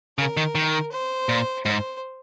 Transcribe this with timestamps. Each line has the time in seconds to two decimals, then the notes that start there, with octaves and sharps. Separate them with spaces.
0.18 C#3 A#4
0.37 D#3
0.55 D#3
0.92 C5
1.29 A#2
1.65 G#2 C5